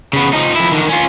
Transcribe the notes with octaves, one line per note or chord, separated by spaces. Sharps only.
C#3 B3
F3 D#4
F2 E4
D3 D#3
C#4 F4